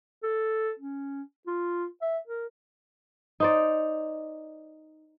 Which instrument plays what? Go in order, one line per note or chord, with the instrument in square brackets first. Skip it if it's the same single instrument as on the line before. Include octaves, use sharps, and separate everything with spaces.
[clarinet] A4
C#4
F4
E5
A#4
[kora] D#4 C5 D5